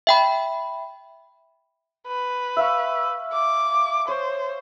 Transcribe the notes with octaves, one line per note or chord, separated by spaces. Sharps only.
E5 G5 B5
B4
E5 F5 C#6
D6
C5 C#5